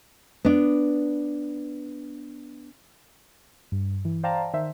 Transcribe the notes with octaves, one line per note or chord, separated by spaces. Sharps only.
B3 D4
G2
E3
C5 D5 F5 G5 A5 A#5
D#3 C5 E5